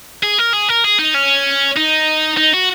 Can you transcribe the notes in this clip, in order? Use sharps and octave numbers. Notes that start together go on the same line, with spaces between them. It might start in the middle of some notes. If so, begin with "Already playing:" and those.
G#4
A#4
G#4
A#4
G#4
D#4
C#4
D#4
D#4
F#4